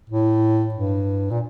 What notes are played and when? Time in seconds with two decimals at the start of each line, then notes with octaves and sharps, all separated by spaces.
0.10 A2
0.75 G2
1.31 A#2